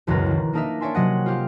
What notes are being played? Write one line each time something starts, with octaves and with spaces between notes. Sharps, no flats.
E1 C#2 F#2 A#4 B4 A#5
E1 D#3
A#3 D4 D#4 A#4 D#5 E5
D4 C#5 D5 E5 G#5 C6
C3 F#3 D#5 F#5
F4 G4 F5